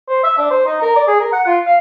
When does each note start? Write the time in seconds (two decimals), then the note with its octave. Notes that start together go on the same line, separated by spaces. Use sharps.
0.08 C5
0.23 E5
0.38 D4
0.51 C5
0.66 D#4
0.82 A#4
0.96 D5
1.08 G#4
1.21 A#4
1.33 F#5
1.46 F4
1.66 F5